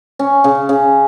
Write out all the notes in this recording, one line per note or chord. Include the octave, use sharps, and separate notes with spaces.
C#4
C#3
C#3